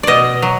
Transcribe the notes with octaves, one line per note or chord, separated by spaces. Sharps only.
B2 D5 D#5
F#3